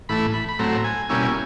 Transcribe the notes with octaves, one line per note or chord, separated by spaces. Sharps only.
A2 E3 A3 B5
B5
B5
A2 F#3 A3 C4 A#5
G#5
B2 G3 A#3 C#4 E4 G#5